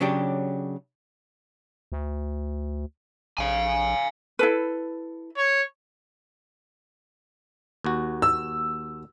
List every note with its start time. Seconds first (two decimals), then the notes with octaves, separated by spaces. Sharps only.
0.01 C#3 F#3 D4 G4
1.92 D2
3.39 A#1 F5 G#5
4.39 E4 A4 B4
5.37 C#5
7.84 D#2 F#4
8.22 E6